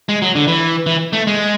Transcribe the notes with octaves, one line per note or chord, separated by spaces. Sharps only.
G#3
F#3
D3
E3
E3
A3
G#3